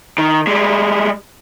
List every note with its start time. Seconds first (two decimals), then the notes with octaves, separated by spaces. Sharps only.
0.18 D#3
0.47 G3 G#3